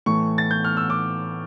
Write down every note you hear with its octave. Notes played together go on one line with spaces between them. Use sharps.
A2 E3 A3 C#6
A6
G6
F6
E6
D6